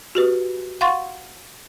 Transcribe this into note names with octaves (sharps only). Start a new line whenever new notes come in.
F#4 G4 B4
F5 F#5 C6 C#6 A6